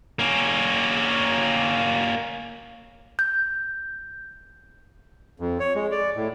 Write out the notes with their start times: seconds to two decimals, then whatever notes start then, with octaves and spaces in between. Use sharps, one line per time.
0.19 A#3 C#4
3.19 G6
5.40 F2
5.60 C#5
5.75 G#3
5.92 D5
6.16 A2